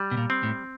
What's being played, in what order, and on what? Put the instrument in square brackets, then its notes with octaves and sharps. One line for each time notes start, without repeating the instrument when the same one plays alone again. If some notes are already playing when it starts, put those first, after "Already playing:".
Already playing: [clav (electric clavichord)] G3
[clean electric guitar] B2
A#2
[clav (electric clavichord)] C4
[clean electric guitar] A2